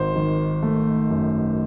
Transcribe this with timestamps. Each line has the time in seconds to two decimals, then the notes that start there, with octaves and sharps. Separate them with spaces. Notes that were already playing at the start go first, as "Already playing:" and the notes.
Already playing: G#1 C5
0.16 D#3
0.63 A3
1.10 F#2